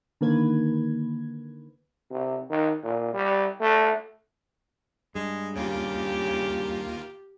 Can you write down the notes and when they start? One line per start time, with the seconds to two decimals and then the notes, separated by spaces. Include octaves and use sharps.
0.21 D3 D#3 A#3 B4 G#6
2.11 C3
2.50 D#3
2.83 A#2
3.14 G3
3.61 A3
5.15 G2 G#3
5.56 D#2 C#3 A#3 F4 G4